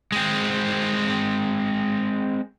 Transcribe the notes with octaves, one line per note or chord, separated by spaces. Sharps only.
G#3 C4